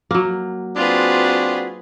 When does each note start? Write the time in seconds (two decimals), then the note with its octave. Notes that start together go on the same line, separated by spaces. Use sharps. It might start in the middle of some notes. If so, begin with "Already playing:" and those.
0.11 F#3 A#3
0.76 C4 D4 F4 F#4 G#4 B4